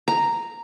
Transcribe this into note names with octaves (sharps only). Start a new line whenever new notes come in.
A#5